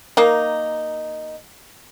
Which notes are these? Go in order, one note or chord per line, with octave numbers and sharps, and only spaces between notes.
A#3 D#4